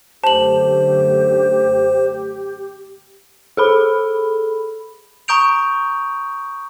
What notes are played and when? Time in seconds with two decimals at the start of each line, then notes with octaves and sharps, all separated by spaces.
0.24 F#2 D3 A3 G4 C5 A5 F#7
3.57 G#4 A4 B5
5.28 A#5 C#6 D#6 G6 D7 F7